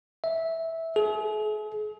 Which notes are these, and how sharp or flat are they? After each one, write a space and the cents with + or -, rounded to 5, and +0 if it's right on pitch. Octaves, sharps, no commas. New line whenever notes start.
E5 -10
G#4 +40